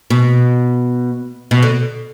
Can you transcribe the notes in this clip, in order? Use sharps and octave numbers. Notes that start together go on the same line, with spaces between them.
B2
B2
D3